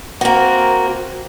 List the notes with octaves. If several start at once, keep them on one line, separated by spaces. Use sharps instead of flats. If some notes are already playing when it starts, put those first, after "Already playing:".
A#3 C4 F#4 A#4